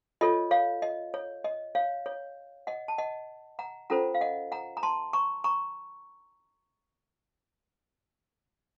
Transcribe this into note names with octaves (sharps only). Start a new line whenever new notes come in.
F4 A4 C#5 D#5
C#5 F5
D#5
C#5
D#5
C#5 F5
C#5
D#5 F#5
A5
D#5 F#5
F#5 A#5
C#4 F4 A4 C5 F#5 A#5
F5
D#5 F#5
F#5 A#5
A#5
A5 C6
A#5 C#6
A#5 C#6